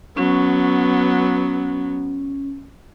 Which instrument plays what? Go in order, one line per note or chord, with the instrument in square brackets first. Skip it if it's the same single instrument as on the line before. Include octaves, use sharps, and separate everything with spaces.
[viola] F#3 B3 [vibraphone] C#4